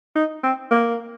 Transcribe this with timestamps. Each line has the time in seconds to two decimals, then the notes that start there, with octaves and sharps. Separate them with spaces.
0.16 D#4
0.44 C4
0.71 A#3